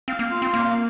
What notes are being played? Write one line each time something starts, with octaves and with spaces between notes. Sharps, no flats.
C4 F5
A#3
F4
C4
A#3 F5